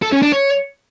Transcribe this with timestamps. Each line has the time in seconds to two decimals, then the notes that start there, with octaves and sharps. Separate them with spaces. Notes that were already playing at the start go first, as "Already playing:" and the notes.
0.02 A4
0.12 C#4
0.22 D4
0.32 C#5